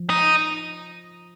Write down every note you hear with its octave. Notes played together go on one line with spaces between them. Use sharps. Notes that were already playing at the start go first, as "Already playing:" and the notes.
Already playing: F3
D#4